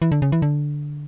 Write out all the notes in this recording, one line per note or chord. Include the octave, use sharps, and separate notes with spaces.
E3
D3
C#3
E3
D3